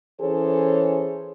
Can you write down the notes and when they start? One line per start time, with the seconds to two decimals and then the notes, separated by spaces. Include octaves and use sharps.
0.21 E3 C#4 G#4 A4 C5 C#5